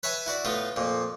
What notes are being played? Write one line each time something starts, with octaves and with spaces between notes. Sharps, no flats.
B4 C#5 E5 G#5
E4 F#4 D5
A2 B3 F4
F2 A#2